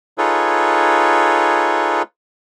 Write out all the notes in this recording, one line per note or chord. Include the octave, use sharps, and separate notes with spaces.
D#4 F4 G#4 A4 B4 C#5